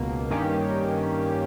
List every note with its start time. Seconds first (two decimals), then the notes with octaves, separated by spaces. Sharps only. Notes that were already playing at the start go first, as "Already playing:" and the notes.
Already playing: C#2 B2 A#3
0.30 G2 D#3 A#3 C#4 G4